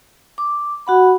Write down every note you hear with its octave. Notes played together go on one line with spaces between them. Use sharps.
D6
F#4 F#5 B5